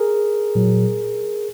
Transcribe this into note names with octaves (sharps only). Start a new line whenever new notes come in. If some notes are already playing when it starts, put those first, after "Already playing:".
Already playing: G#4 A#4
A#2 F#3